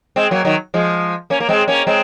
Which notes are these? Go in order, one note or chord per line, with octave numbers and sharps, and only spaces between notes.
G#3 C4
F#3 A#3
D#3 F#3
F3 G#3
A#3 C#4
A#3
G#3 C4
A#3 C#4
G#3 C4